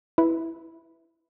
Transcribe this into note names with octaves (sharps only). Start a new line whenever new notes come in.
E4 B4